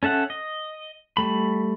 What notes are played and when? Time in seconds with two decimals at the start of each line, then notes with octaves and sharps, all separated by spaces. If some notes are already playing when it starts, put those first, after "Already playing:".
0.03 C#4 A4 E5 F#5
0.30 D#5
1.17 G3 A3 B5